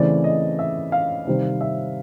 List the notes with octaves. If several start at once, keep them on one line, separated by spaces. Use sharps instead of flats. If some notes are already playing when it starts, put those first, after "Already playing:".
Already playing: C#3 E3 A3 C4 D5
D#5
E5
F5
C3 D#3 G3 C4
E5